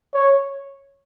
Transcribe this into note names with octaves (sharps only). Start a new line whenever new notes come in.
C#5